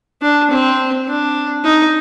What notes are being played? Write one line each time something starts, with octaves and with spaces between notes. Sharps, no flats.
D4
C4
D4
D#4